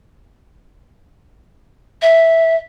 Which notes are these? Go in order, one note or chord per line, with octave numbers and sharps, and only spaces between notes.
E5